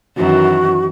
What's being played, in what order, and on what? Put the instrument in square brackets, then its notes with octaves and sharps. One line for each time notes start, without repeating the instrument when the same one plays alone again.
[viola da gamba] F#2 D#3 E3 [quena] F#4